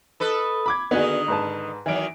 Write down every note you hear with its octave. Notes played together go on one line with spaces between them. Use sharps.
A4 B4 D#5
B5 D6 G#6
D3 D#3 B3 D#4 F#4 G#4
G#2 B4 A5
D#3 E3 F#3 D7